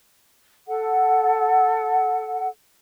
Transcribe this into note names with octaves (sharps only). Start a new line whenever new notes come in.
A4 F#5